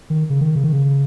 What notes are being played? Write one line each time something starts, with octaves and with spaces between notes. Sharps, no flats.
D#3
C#3
D#3
C#3
D#3
C#3